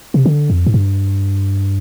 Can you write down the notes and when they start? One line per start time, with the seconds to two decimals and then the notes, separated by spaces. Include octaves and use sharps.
0.14 C3
0.26 D3
0.50 F2
0.66 G#2
0.74 G2